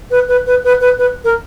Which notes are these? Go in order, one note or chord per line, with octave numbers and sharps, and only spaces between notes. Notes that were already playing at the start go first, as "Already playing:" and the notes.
B4
B4
B4
B4
B4
B4
A#4